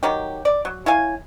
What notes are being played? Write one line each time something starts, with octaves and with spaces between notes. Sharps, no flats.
D#3 F#3 G4
D5
F#3
E4 C#5 F5 G#5